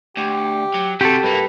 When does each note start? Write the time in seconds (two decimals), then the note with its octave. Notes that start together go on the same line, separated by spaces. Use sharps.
0.17 D2 G4
0.74 F#3
1.01 C3 F#4 G4 A4
1.23 G2 A#3 B4